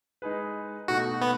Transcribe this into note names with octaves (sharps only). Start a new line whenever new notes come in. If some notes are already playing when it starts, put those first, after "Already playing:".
G#3 D#4 G#4 B4
B2 A3 D#4 F#4
B3